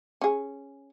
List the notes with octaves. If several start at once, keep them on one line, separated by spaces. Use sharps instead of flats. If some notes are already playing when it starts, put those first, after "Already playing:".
C#4 G#4